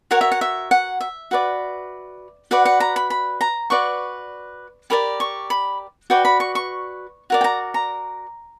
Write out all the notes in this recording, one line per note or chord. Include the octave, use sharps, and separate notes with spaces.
F#4 A#4 C#5 F#5
E5
F#5
E5
F#5
E5
F#4 B4 D5
F#4 B4 D5 F#5
F#5
A#5
B5
B5
A#5
F#4 B4 D5 C#6
G4 A#4 D5 B5
C#6
B5
F#4 B4 D5 G5
B5
C#6
C#6
F#4 A#4 D5
G5
A#5
A#5